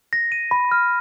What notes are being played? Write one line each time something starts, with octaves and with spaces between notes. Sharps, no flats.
A#6
D#7
B5
F6